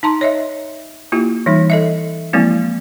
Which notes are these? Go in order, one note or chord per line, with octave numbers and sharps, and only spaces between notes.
D#4 A5 A#5 C6
C#5 D#5 E5
A#3 E4 F4 G4
E3 G3 D#4
A4 D#5 E5
F3 G#3 A#3 C4 E4